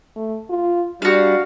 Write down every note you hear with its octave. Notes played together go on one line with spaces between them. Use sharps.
A3
F4
G3 D4 F#4 F5